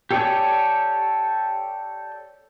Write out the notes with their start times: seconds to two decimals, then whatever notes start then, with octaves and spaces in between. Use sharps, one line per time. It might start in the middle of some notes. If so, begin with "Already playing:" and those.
0.11 G4 A4 C#5 D5 G#5